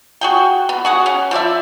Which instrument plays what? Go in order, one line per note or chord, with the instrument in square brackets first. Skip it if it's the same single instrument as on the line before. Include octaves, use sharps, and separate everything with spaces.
[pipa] F#4 G#4 G5
B3
F#4 G#4 F#5
C#4
F3 E4 D5 E5